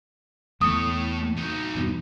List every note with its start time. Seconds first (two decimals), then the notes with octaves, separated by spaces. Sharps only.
0.61 E2 A3 C#5 D#6
1.38 D#4 F#4
1.75 E2 G2 B2